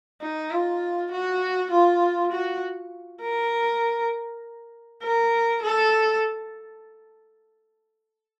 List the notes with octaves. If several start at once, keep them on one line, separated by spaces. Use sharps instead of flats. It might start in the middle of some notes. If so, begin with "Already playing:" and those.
D#4
F4
F#4
F4
F#4
A#4
A#4
A4